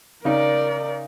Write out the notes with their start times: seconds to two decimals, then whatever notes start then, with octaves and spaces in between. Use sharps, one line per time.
0.25 C#3 D#4 A#4 D5